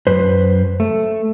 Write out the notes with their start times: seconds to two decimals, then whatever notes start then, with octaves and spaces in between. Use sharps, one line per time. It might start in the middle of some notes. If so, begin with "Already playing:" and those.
0.07 F#2 B4 C5
0.80 A3